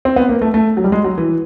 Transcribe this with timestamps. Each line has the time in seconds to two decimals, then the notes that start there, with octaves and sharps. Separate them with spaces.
0.05 C4
0.16 B3
0.29 A#3
0.42 A3
0.54 A3
0.77 F#3
0.84 G3
0.92 G#3
1.04 F#3
1.18 E3